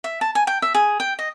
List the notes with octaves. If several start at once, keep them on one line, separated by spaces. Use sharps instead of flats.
E5
A5
G#5
G5
E5
G#4
G5
D#5